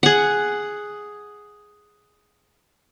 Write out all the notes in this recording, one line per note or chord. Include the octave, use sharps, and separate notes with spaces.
G#4 F#5